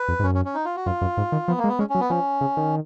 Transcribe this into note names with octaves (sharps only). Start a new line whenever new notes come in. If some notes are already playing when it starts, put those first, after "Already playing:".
Already playing: B4
F2
G#2
F#2 C#4
C#4
C#4
D#4
F4
F#4
F#2 F4
F#2
G#2
D#3
F3 B3
A#3
G#3
B3
G#3 C#4
F#3 C#4
B3
F3 C#4
C#3
D#3